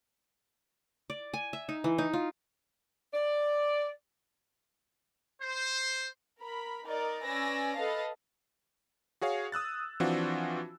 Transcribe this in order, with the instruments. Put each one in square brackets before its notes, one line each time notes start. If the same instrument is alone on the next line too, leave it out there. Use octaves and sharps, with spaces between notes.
[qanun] D5
G#5
E5
D#4
E3
D#4
F4
[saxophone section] D5
[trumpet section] C5
[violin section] A#4 B5
D#4 A#4 D5 D#5
C#4 B4 D5 G#5 E6 A#6
A4 B4 D#5 F5 A5
[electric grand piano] F#4 G#4 C#5 F5
D#6 E6 F#6 A6
E3 F3 C4 D4 F4 F#4